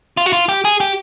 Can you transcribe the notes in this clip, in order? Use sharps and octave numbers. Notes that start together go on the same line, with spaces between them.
F4
F#4
F4
G4
G#4
G4